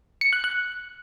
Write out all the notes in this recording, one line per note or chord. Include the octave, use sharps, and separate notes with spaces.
C#7
F#6
F#6